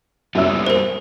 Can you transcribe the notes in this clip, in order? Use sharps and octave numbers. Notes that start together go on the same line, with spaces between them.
F#2 G3 A#3 B3 E4 E6
D#6
A#4 C5